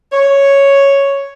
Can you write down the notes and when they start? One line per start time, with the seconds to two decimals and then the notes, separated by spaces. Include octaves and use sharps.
0.11 C#5